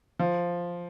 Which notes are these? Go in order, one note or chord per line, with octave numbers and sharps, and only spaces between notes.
F3